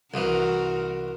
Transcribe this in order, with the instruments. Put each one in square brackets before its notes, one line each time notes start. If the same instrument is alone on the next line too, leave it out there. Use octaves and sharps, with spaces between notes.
[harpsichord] C2 E3 [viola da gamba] F#4 A#4